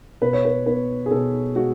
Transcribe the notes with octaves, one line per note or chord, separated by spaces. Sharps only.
B2 B4
C#5
B4
B3 B4
G#4
B2 A4
G#3 F#4